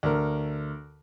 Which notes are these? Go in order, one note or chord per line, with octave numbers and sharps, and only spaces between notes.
D2 A#4